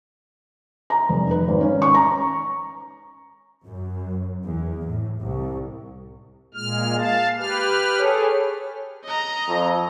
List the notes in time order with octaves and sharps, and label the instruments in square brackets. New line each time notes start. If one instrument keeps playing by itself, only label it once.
[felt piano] A#5
F1
B4
G#1
C#4
C#6
A#5
[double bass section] F#2
E2
A2
C2
[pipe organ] A#2 G#3 F6
F5 A5
G4 B4 F6
[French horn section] G#4 A4 C#5
[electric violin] D#5 A#5
[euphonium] F2